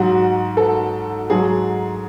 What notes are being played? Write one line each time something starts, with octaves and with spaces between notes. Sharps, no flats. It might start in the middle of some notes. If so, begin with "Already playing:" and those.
Already playing: G#2 F#3 F#4
A4
G#2 F#3 G#4